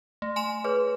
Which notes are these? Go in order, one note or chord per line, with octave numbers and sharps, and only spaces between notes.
A3
G#5 C6 E7
G#4 B4 C#5